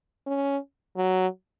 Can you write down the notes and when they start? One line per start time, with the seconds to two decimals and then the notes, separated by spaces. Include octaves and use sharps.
0.27 C#4
0.96 F#3